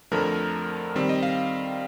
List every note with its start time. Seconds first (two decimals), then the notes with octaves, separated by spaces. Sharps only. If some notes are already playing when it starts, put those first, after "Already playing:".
0.12 F2 D3 F3 A3 A#4
0.95 D#3 G3 C4
1.09 D#5
1.23 F5